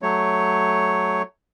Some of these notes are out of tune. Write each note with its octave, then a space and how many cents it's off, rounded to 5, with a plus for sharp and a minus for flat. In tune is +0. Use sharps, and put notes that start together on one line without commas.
F#3 +0 A3 -10 C#5 +0